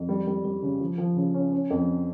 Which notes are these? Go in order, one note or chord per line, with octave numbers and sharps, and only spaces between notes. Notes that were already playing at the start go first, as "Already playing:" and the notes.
Already playing: F2
G3
G3
G3
C#3
F3
F3
C#3
C#4
C#4
F2